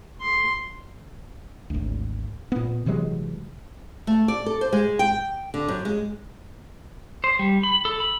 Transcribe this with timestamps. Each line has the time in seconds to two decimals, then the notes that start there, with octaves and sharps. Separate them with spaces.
0.21 C6
1.70 G#1 D2
2.52 A#2 B3
2.86 C3 E3 F#3 G#3
4.07 A3
4.28 D5
4.46 A4
4.61 C5
4.73 G#3
4.99 G5
5.54 D3
5.68 F#2
5.85 G#3
7.24 C5
7.39 G3
7.63 B5
7.85 A4
8.00 B5